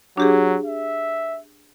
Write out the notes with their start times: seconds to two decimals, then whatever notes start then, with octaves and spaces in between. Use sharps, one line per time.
0.17 F#3 D4 G4 G#4
0.66 E5